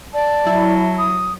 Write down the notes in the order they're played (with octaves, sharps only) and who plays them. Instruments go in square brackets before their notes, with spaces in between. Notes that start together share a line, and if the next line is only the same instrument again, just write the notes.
[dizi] D5 [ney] A5
[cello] F#3 [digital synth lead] E4
[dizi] D#6